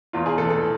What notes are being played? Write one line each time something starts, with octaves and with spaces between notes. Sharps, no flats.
E2 F4
G#4
E3 A4
A4